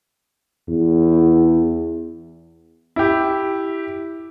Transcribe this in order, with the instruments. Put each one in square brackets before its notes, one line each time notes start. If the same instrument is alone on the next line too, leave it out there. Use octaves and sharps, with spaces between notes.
[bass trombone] E2
[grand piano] E4 G4